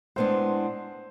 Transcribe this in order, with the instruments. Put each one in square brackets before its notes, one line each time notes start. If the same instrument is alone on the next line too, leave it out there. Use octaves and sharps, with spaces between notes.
[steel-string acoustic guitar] A2 G#3 B3 D4 [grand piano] C5